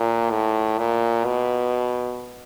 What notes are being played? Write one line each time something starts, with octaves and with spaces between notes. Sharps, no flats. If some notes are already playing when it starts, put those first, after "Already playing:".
Already playing: A#2
A2
A#2
B2